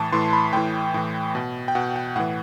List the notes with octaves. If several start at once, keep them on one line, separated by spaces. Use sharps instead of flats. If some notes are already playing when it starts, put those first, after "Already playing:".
Already playing: A2 E3 A5
A2 E3 C6
B5
A2 E3 G5
A2 E3
B2
G5
B2 F#5
G5
A2 E3 F#5